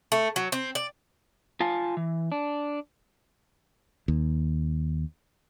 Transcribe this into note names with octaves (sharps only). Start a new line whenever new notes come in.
A3
F#3
C4
D5
F4 F5 G#5 A5
E3
D4
D#2